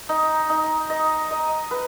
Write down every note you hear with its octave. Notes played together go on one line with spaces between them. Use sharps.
D#4
D#4
D#5
D#5
B4